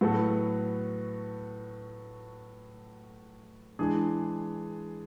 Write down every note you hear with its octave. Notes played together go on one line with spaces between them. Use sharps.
A2 F#3 B3 F#4 A4
E3 G#3 D4 G#4